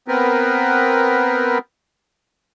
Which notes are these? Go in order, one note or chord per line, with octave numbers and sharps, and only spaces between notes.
B3 C4 A#4 B4